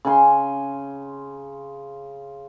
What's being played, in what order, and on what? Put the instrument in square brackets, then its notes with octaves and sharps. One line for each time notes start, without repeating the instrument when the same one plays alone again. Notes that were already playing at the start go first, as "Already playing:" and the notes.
[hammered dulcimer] C#3 G#5 C6